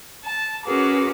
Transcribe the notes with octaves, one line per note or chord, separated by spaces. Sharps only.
A5
C#4 F#4 G#4 A#4 B4 D6